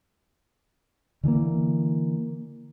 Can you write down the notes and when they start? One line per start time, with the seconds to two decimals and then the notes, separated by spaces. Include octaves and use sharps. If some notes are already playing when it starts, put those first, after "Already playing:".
1.23 D3 E3 A3 A#3